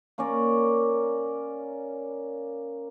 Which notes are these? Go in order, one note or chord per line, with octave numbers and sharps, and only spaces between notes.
A#3 C#4 A#4 D5